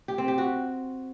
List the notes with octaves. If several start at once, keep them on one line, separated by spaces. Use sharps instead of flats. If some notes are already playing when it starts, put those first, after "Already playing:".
G4
C4
G4
F#4